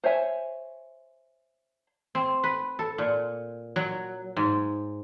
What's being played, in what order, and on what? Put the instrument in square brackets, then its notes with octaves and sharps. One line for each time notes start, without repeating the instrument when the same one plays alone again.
[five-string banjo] C5 C#5 E5 G#5
[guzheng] C4
B4
A4
A#2
F#3
G#2